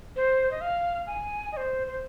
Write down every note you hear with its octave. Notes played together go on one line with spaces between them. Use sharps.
C5
D#5
F5
G#5
D#5
C5
C5